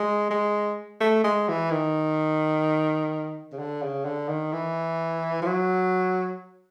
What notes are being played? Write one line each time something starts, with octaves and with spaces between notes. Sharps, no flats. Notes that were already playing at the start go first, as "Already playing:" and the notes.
Already playing: G#3
G#3
A3
G#3
E3
D#3
C#3
D3
C#3
D3
D#3
E3
F3
F#3